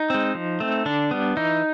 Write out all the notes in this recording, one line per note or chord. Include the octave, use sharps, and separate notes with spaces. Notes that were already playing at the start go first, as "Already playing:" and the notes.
Already playing: D#4
G#3 C4
F3
A3 C4
D3 D4
G3 B3
E3 D#4